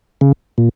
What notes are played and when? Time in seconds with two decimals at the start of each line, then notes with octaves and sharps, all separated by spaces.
0.21 C#3
0.58 A#2